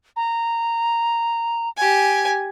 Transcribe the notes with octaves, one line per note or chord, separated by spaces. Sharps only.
A#5
G4 G#5